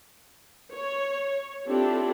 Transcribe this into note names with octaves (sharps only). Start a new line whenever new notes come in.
C#5
C4 D4 E4 F4 G4 A4